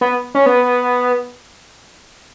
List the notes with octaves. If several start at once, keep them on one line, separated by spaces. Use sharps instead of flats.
B3
C#4
B3